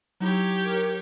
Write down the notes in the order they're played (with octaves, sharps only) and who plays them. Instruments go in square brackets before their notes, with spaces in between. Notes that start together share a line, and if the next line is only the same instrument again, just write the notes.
[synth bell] F#3 D#4 E4 [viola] G4 C#5
[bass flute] A#4